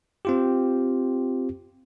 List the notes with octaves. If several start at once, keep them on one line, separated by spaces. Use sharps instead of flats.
C4 F4 G4